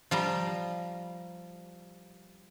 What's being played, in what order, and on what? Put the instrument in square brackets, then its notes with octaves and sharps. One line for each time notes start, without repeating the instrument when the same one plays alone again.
[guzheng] F3 G3 A#5